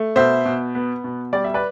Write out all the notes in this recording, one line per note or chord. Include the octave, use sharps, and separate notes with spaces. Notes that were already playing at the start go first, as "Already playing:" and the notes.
Already playing: A3
B2 C5 E5
B2
B3
B2
G3 D5
E5
B4 D5